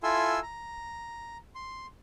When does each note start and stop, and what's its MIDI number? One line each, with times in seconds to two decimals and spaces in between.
0.03 0.40 64
0.03 0.40 65
0.03 0.40 69
0.03 0.40 80
0.03 0.40 84
0.03 0.40 88
0.42 1.37 82
1.55 1.86 84